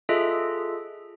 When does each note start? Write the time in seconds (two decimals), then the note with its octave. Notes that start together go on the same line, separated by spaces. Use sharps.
0.09 F4 G#4 A4 D#5 E5